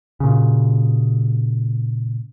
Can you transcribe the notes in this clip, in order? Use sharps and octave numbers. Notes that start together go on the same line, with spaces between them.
A#2 C#3